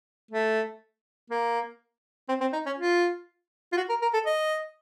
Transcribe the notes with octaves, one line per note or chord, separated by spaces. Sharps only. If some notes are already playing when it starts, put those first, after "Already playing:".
A3
A#3
C4
C4
D#4
C#4
F4
F4
F#4
A#4
A#4
A4
D#5